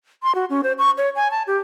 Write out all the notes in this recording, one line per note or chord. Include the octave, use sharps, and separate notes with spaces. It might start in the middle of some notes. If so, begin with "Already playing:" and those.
C6
F#4
C#4
C5
C#6
C#5
G#5
A5
G4